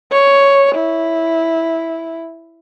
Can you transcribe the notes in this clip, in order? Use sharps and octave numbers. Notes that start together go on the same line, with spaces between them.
C#5
E4